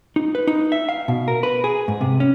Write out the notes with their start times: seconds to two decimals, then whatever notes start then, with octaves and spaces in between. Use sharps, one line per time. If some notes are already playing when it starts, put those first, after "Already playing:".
0.16 D#4
0.35 B4
0.47 D#4
0.72 E5
0.89 F5
1.08 B2
1.28 A#4
1.43 B4
1.64 G#4
1.88 G#2
2.01 C3
2.20 C#4